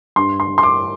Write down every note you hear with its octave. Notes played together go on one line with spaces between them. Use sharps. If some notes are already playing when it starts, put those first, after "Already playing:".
G2 C6
C6
G2
C6
D6